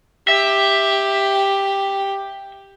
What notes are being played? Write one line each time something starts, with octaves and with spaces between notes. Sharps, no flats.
G4 E5